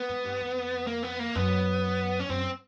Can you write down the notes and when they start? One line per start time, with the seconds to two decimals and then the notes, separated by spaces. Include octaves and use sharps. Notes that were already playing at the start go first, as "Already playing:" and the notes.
Already playing: B3
0.09 G#2
0.25 G2
0.41 F2
0.87 A#3
1.03 B3
1.19 A#3
1.35 F#2 B3
2.19 C#4
2.29 F#2 C4